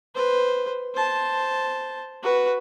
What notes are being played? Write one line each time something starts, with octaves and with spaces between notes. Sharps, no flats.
B4 C5
C5 A5
F#4 B4